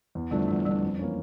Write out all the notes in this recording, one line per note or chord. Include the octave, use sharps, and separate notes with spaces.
E2
D3 F3 G3 A3 D4
E2 G3
D3 F3 G3 A3 D4
F2
E3 A#3 C#4